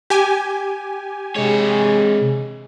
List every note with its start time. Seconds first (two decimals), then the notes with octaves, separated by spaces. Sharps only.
0.10 G4 G#5
1.36 C3 G#3 C#5